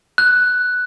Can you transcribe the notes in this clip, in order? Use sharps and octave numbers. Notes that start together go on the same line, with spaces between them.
F#6